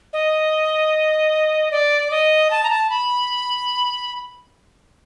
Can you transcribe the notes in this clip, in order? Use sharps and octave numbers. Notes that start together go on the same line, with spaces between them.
D#5
D5
D#5
A5
A#5
A5
B5